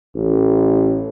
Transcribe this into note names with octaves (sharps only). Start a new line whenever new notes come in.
A1